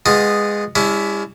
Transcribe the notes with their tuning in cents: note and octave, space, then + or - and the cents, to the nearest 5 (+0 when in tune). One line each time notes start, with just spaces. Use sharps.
G#3 -10 B3 +0 F4 +20
G3 +45 C#4 +35 E4 +0